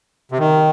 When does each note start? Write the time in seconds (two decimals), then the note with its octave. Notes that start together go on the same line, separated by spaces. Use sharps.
0.32 C3
0.39 D#3